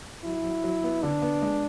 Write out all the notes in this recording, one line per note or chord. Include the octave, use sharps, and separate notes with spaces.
F#3 E4
F#3
F#3
B3
D3 D4
B3
G#3